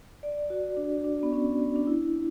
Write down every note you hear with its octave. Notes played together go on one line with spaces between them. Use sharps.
D5
F#4
D4
D4
B3
C#4
D4
E4